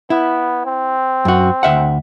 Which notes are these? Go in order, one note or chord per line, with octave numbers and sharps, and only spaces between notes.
B3 E4
C4
F#2 F#4
D2 E5 F#5